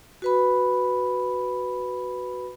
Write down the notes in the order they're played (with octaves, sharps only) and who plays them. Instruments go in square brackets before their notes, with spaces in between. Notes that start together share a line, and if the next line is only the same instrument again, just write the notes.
[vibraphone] F#4 B4 B5